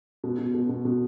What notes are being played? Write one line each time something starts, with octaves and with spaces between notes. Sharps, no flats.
B2
B2
B2
B2
B2